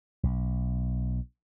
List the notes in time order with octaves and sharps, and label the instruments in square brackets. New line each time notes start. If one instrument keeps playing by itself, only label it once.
[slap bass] B1